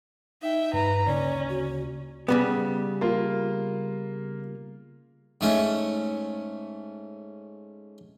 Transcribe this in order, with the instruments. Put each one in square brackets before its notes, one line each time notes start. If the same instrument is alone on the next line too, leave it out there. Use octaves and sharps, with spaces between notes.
[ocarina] D#4 [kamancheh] E5 G5
[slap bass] G2 [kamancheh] B4 A#5
[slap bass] D2 C#3 A#3 [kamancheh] C#4 [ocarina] D5
[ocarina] F#4
[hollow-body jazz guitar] C#3 G3 B3
[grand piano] A#3 F4
[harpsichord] G#2 A3 C#4